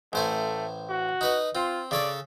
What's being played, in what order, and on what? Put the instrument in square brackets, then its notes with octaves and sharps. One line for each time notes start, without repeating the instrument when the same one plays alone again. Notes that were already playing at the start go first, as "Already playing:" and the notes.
[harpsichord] A1 C5 G#5 [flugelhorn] A3
[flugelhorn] F#4
[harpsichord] D#4 B4 D#5
[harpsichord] C4 [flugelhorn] F4
[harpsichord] C#3 A4 C#5 [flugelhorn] D5